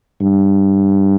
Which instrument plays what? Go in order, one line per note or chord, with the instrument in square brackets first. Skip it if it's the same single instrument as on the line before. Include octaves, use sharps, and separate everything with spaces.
[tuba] G2